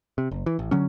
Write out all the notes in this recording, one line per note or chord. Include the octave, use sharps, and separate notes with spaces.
C3
F#1
E3
A1
D3 F#3 C#4